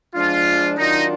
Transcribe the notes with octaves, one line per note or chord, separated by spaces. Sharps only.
F3 G#3 D4 F4
D#3 F#3 D4 D#4 F4